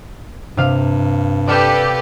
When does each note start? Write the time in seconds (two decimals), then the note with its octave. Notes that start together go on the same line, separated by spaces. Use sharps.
0.57 G2 C3 F5
1.48 G4 A4 B4 D5 F5 E7